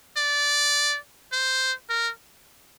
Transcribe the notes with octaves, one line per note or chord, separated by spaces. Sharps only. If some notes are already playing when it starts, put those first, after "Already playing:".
D5
C5
A#4